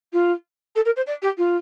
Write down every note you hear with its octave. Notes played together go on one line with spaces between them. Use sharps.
F4
A4
A#4
C5
D5
G4
F4